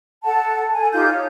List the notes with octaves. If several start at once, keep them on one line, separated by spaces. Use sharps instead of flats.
A4 F#5 A5
A4 G#5
D#4 F4 G4 G6
C#5